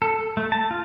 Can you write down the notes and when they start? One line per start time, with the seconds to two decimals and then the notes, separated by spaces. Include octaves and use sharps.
0.02 A4
0.37 A3
0.52 A5
0.71 F4